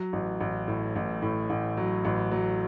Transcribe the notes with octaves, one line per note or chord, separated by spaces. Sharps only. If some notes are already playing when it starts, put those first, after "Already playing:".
Already playing: F#3
A1
A1
A2
A1
A2
A1
F#3
A1
F#3